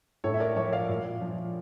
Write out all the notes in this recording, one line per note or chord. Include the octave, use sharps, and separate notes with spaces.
A2 A4 C#5
E5
A#4 D5
F3 C#5 E5
D5 F5
A#2
F3